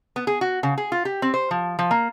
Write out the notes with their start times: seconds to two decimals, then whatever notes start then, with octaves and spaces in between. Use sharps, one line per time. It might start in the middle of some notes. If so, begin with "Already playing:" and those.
0.16 B3
0.27 G#4
0.41 F#4
0.63 C#3
0.78 G#4
0.92 F4
1.05 G4
1.22 C4
1.34 C5
1.51 F3
1.79 F3
1.91 A#3